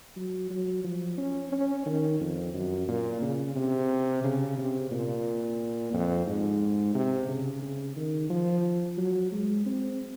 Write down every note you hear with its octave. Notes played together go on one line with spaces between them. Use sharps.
F#3
F#3
F3
C#4
C#4
D#3
F2
F#2
A#2
C#3
C3
C#3
C3
A#2
F2
G#2
C3
C#3
C#3
D#3
F3
F#3
G#3
C4